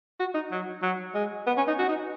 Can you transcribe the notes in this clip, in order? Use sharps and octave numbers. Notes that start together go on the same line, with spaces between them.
F#4
D#4
F#3
F#3
G#3
B3
C#4
D#4
F#4
D#4